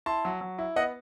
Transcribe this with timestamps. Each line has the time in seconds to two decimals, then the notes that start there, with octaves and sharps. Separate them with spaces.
0.06 E4 A5 C6
0.25 F#3
0.41 F#3
0.59 E4
0.76 B3 D#5 F#5